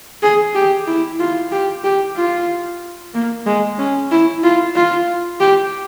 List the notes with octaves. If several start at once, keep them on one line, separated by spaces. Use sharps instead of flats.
G#4
G4
E4
F4
G4
G4
F4
A#3
G#3
C#4
E4
F4
F4
G4